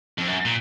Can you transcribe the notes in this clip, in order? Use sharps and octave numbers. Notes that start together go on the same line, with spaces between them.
F2
F#2
A#2